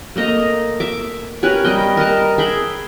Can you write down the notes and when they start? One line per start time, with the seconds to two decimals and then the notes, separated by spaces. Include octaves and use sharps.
0.16 A3 A#3 D#5 A#5
0.80 E5 D6
1.43 C#4 G4 A#4 B4
1.64 G3 D#5 G5
1.97 A#4 B4 D#5 A5
2.38 G#4 E5 G5 B5